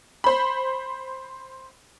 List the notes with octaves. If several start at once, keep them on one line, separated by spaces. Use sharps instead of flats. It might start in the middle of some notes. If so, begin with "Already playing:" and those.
C5 B5